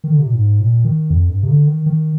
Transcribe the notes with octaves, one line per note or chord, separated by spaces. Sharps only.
D#3
D3
C3
A#2
G#2
A#2
D#3
F2
G2
C3
D3
D#3
D#3